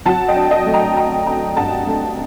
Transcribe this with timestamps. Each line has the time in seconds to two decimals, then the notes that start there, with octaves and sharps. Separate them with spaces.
0.06 F#3 F#5 A5
0.28 D#5 G5
0.36 D4
0.51 D#5 G5
0.66 A3
0.74 G5 A#5
0.96 D4 G5 A#5
1.27 D4 G5 A#5
1.56 G2 F#5 A5
1.87 A3